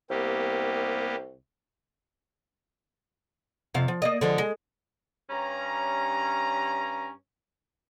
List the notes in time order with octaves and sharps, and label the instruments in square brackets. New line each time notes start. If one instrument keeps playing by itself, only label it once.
[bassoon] C2 [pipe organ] A#3 B3 G4
[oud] F2 C3 F5
F3
A#3 D5 D#5
D3 F3 G#3
G#3
[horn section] G2 C#4 A#5